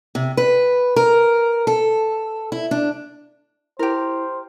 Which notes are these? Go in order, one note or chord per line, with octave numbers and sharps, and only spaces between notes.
C3
B4
A#4
A4
E4
D4
E4 G4 A#4 C5